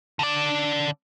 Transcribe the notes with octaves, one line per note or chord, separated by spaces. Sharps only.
D3 D5